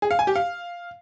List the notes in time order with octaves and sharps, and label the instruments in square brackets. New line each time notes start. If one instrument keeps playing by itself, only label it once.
[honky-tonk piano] G#4
F5
G#5
G4
F5